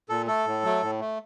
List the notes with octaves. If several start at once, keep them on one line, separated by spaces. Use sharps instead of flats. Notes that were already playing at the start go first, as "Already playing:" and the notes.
A#2 A4
A3 A4
A2
F#3 A3
A2
A3